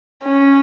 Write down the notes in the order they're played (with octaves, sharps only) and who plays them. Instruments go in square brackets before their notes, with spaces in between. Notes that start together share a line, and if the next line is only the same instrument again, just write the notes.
[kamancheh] C#4